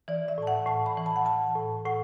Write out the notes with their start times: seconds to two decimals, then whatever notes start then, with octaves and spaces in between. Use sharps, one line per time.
0.08 E3 D5
0.28 E5
0.38 A2 A5
0.47 F#5
0.66 A2 A5
0.86 B5
0.97 E3
1.06 A5
1.16 F#5
1.25 E3 A5
1.55 A2
1.85 A2 F#5